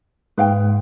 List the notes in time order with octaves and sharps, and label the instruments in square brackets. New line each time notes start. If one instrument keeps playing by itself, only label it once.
[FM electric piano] G#2 [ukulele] B4 F5 G5